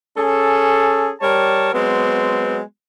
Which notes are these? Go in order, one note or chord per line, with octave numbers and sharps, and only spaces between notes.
C#4 G#4 A4
G3 A#4 C#5 A5
F#3 G#3 B3 C4